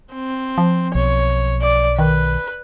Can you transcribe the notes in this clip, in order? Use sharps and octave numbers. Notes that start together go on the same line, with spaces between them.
C4
F3
B1 C#5
D5
D#3 B4